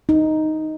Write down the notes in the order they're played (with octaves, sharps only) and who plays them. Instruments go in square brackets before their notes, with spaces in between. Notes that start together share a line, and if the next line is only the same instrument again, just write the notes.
[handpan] D#4